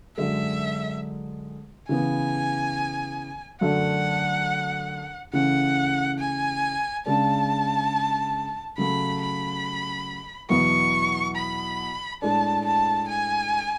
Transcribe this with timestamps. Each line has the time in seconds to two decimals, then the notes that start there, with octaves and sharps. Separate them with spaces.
0.17 F#2 D3 G#3 E5
1.89 C#3 E3 B3 G#5
3.61 F#2 D3 A3 D4 F#5
5.33 C#3 E3 A3 C#4 F#5
6.19 G#5
7.06 C#3 G#3 D4 A5
8.78 C#3 F#3 A3 B5
9.21 B5
10.49 E2 B2 F#3 B3 E4 C#6
11.36 B5
12.22 A2 G#3 D4 A5
12.65 A5
13.08 G#5